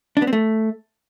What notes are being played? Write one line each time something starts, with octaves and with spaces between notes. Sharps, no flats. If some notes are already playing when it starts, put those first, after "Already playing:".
D4
B3
C4
A3